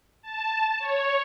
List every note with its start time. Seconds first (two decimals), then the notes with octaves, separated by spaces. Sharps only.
0.22 A5
0.79 C#5